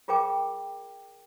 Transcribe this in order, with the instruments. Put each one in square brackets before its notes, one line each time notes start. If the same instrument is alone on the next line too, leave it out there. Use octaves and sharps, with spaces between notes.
[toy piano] F4 G#4 A#4 G5 D6